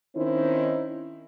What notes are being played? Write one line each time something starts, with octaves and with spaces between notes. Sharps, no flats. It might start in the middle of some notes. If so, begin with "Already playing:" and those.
D#3 C4 C#4 D#4 E4 C5